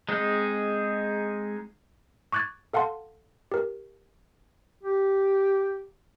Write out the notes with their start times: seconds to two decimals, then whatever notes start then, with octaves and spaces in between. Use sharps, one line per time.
0.09 G#3 C4 D#4 G#4
2.32 C#6 D6 F#6 G#6 A6
2.73 A4 F5 F#5 A5 C6
3.52 G4 A#4
4.83 G4